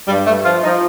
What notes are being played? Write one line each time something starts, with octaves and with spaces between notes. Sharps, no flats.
G2 G3
G2 A3
F3 F4
F3 D#4